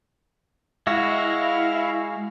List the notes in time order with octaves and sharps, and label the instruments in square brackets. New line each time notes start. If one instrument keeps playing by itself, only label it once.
[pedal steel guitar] G#3 F#4 [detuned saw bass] E4 [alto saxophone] F5